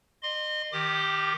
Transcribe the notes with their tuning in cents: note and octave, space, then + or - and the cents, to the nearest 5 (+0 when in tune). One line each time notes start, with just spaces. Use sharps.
D#5 -35 C6 +0
D#3 +0 G4 +0 D6 +35